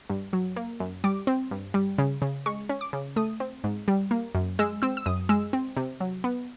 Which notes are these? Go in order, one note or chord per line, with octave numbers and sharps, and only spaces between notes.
G2
F#3
A#3
F#2
G3 D6
C4
G2
G3
C#3
C#3
G#3 C#6
C#4
D6
C#3
A3 D#6
C4
G#2
G3
A#3
F#2
G#3 E6
C4 E6
E6
F#2 D#6
G#3 E6
C4
C3
F#3
B3